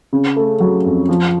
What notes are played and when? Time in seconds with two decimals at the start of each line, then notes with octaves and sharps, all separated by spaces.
0.13 C#3
0.36 A3
0.60 F#3
0.85 F2
1.09 F3